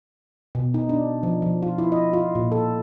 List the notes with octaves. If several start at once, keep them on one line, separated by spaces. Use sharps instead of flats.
B2
D#4
D4
F3
F3
F4
E4
D#5
F4
A#2
A4